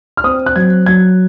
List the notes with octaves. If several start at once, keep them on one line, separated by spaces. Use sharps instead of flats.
F6
C4 D#6
F#6
F#3 G#6
F#3 G#6